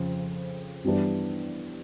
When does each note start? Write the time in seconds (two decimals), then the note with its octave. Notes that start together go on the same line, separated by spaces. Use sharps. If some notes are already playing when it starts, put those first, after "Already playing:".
Already playing: F2 C#3 F3
0.84 G2 E3 G3 B3 D4